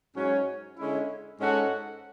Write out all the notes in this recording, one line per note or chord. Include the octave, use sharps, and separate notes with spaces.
G#2 F#3 C#4
D3 G#3 C#4 E4
G#2 G#3 C#4 F#4 A4